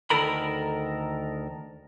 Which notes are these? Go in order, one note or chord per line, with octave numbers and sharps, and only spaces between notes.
D2 D#3 A4 A#4 B5